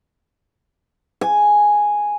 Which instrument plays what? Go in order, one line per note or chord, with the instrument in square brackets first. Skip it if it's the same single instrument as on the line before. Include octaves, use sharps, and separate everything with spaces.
[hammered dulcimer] G#5